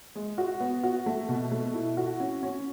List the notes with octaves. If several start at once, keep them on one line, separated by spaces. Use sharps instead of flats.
G#3
F#4
B3
F#4
A3
B2
A3
E4
F#4
C#4
C#4